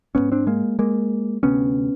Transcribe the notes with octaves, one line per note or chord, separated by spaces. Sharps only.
G#1 G#2 B3 C#4
C4 D4
G#3 A#3
G#3 A#3
D2 C3 B3 C#4